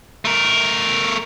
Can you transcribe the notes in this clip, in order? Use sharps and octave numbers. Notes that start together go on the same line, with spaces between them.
A3 A#4